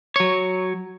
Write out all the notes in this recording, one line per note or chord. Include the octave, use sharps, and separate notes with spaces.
F#3 C#5